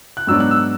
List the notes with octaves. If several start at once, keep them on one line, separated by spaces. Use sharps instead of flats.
F#6
G#2 F#3 B3 D4 E6
F#6
E6